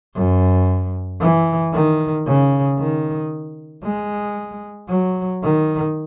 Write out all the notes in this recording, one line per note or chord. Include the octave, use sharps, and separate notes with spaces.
F#2
E3
D#3
C#3
D#3
G#3
F#3
D#3